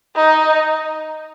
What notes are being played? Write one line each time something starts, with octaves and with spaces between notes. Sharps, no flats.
D#4